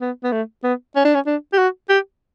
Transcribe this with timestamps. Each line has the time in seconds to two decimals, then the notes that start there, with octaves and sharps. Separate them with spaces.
0.01 B3
0.24 B3
0.32 A3
0.64 B3
0.96 C#4
1.05 D4
1.15 C#4
1.27 D4
1.53 G4
1.58 F#4
1.89 G4